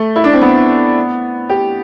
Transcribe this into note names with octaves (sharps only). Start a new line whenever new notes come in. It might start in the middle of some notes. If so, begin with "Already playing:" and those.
Already playing: A3
E4
D4
C4
B3
G4